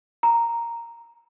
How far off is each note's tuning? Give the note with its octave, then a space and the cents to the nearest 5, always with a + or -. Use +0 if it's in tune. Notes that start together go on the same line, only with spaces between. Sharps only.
A#5 -5